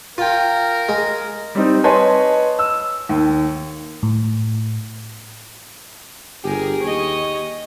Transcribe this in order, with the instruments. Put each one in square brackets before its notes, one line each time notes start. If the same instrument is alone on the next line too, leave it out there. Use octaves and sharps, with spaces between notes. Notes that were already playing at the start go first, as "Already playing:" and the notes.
[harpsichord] F4 G5 [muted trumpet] A#4
[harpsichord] G#3
[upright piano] G3 C4 D#4
B4 C#5 D#5 G#5 A5 C6
E6
D#2
[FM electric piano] A2
[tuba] G1 [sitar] G4 [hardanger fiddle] G#4 A#4
[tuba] D#2 [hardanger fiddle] C#5 D#5